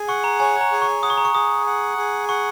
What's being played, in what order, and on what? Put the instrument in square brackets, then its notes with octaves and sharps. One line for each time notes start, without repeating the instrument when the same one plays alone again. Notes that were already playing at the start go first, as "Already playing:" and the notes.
Already playing: [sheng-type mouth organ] G#4
[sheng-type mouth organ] F#5 [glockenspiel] C#6
[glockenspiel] A#5
[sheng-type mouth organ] C#5 [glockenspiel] G#5
[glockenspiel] A#5
[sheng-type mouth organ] G#4
[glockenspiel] C#6
[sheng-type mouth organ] F#5 [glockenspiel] D#6
[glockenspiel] C#6
A#5
C#6
[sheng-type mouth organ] G#4 [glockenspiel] D#6
[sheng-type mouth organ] F#5
G#4
[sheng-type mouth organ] F#5 [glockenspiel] C#6